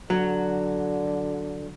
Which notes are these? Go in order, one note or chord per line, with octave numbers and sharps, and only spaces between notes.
D3 F#3